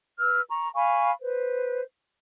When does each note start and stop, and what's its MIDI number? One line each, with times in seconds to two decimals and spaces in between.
0.19 0.41 71
0.19 0.41 88
0.19 0.41 89
0.49 0.67 82
0.49 0.67 85
0.75 1.10 77
0.75 1.10 80
0.75 1.10 83
0.75 1.10 85
1.21 1.81 71
1.21 1.81 72